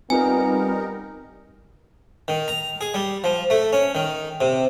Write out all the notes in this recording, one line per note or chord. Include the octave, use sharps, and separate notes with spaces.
G3 B3 C4 D#4 F4 A#4 B4 G#5
D#3
A#5
G#4
G3
F3
A3
C#4
D#3
C3